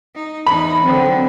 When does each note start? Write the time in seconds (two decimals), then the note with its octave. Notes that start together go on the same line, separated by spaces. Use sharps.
0.15 D#4
0.47 E2 D#4 B5
0.84 D3 F#3 C4